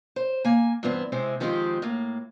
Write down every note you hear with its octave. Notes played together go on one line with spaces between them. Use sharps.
C5
A#3 G#5
G2 E3 B3 C4
C3 G#3 C4 E4
D#3 F3 G#3 C4 D#4 G4
A2 A#3